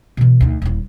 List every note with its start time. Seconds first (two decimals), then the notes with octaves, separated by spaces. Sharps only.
0.17 B2 E3
0.41 D2 D#4
0.62 D#1 E4